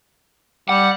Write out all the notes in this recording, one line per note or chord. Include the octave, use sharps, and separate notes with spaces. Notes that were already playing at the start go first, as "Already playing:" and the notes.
G3 F#5